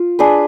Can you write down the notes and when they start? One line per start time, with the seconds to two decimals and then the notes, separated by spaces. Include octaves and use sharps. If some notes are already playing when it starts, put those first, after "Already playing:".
Already playing: F4
0.19 D4 G#4 B4